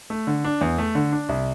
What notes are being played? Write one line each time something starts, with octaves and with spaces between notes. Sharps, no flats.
A3
D3
D4
E2
A3
D3
D4
C2